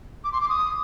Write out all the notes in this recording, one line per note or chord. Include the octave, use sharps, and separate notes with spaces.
D6
C6
D6
D#6